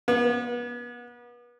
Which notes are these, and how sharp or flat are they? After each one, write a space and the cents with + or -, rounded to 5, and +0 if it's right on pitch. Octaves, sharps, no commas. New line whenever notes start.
B3 -35